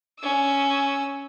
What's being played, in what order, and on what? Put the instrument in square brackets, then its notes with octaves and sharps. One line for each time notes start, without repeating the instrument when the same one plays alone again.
[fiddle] C#4 E6